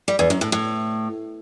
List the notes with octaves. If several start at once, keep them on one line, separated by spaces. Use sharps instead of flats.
G3
E2
F#2
A2
A2